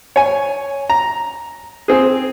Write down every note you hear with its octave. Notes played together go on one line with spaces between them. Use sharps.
C#5 G#5
A#5
C4 G#4